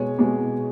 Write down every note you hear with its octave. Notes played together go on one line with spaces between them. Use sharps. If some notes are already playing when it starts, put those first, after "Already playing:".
Already playing: B2 G#3 C#5
B2 G#3